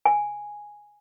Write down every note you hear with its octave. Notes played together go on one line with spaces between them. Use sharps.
G#5